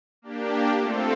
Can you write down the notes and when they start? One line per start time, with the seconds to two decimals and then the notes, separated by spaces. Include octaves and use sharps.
0.22 A#3 D4 G4
0.80 A3 C4 F4 A4